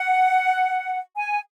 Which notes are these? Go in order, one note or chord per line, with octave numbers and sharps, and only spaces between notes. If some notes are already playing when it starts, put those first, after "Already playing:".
Already playing: F#5
G#5